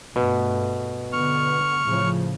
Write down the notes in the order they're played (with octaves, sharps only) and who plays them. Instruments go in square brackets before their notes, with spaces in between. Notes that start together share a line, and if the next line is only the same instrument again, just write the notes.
[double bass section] G2 A3 [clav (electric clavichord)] B2
[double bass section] D3 B3 [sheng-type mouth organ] C#6 F6
[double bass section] A2 C#3 F3